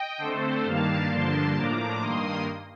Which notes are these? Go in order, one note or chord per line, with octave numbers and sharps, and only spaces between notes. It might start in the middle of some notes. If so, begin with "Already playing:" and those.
Already playing: D#5 G5
D3 A3 C4 A4 C5
G2 D#3 G3 A#3 D4 F5 A5
G2 D3 F3 A#3 D4 A5 C6
A2 F3 A#3 D4 A#5 D6
G2 D#3 A#3 C6 D#6